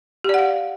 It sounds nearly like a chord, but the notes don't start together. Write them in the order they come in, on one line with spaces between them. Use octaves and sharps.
G4 D5 F#5 F5